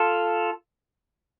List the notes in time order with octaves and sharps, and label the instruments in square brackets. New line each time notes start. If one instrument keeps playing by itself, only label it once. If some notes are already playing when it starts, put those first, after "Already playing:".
Already playing: [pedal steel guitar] F4 A4